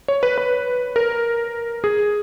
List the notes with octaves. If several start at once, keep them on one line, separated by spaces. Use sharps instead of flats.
C#5
B4
B4
A#4
G#4